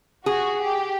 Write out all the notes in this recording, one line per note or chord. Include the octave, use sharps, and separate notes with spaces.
F#4 G#4
G4